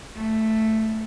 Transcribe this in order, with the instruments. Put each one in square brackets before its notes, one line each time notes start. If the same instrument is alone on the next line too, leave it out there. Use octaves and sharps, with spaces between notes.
[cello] A3